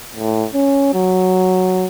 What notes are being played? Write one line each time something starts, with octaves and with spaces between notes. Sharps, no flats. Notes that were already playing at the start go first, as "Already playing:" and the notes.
A2
C#4
F#3